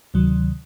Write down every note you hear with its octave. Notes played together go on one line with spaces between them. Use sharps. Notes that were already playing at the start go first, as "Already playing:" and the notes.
D2 C3 D#3 F#3